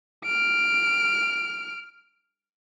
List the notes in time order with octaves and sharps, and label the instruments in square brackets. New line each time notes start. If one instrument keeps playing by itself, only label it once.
[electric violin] F6 D7